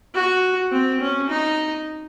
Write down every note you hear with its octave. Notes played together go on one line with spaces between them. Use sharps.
F#4
C4
C#4
D#4